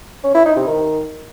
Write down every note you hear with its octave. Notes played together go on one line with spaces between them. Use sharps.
C#4
E4
D#4
C3
D#3